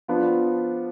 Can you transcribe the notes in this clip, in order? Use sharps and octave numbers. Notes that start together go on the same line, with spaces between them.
F3 B3 D4 F4